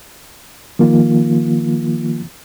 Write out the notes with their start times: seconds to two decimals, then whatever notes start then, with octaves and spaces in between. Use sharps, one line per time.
0.79 D#3 F3 A#3 F4